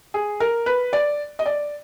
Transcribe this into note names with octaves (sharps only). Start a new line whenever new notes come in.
G#4
A#4
B4
D5
D#5
D5